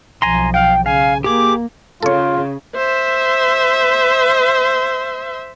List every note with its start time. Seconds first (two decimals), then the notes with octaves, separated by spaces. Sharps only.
0.22 B1 F3 G#5 A#5 C6
0.54 F5 G5
0.86 C#3 F5 G#5
1.24 A#3 G4 G#4 D6
2.02 C#3 F4 A4 C#5
2.75 C5 E5